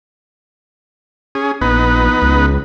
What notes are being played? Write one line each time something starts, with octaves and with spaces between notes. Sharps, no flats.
C#4 G#4
A#1 B3 D#4 B4
C#2